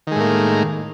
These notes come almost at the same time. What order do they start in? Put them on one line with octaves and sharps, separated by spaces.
D#3 G#3 A2 A#3